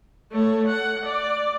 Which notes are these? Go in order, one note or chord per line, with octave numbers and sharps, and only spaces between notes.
A3 C#5
F#5
D5